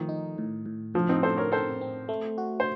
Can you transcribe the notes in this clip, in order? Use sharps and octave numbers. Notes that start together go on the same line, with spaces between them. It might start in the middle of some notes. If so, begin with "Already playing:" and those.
Already playing: D#3 F3 A3
D#4
A2
A2
A2 F3
C4 D#4
A2 A4 C5
A#4 C#5
C4 A4 C5
C4
A3
F#4
C5